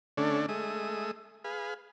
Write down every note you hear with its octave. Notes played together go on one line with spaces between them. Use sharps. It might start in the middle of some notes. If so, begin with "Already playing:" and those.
D3 A3 C#4 D4
G#3 A3 E5 D#6
G#4 B4 F5